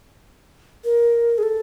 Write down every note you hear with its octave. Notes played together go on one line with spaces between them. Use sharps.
A#4
G#4
A4